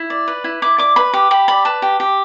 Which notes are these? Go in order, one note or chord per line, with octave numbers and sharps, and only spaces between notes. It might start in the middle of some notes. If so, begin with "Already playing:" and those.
Already playing: E4
D5
B4
E4
E4 D6
D5 D6
B4 B5
G4 D6
G4 B5
D5 B5
B4 A5
G4
G4